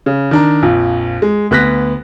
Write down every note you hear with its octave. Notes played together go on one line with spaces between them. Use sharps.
C#3
D#3 D4 A#5
A#1 F2
G#3
D2 B3 F#6 A#6 B6